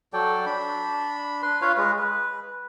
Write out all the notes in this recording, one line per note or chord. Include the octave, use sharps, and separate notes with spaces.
F#3 A4 D5 G5
D4 B5
B4 C6
F4 B4 C#5 F5
G#3 B4
B4